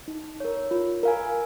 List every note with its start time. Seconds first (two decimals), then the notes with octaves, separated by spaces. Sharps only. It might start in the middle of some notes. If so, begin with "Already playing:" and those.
0.08 D#4
0.40 A#4 C#5
0.71 F4
1.03 A#4 F5 G#5